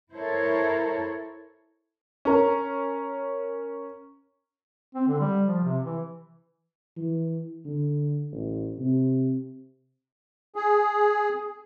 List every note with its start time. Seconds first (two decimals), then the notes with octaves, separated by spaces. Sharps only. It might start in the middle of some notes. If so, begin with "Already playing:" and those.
0.14 E4 A4 A#4 C5 C#5
2.25 C#4 A#4
4.95 C4
5.08 D3
5.20 G3
5.47 F3
5.64 C3
5.85 E3
6.97 E3
7.66 D3
8.32 A1
8.79 C3
10.56 G#4